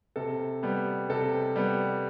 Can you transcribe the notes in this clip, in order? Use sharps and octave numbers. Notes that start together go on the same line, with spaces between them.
C3 A4
G3 B3
C3 A4
G3 B3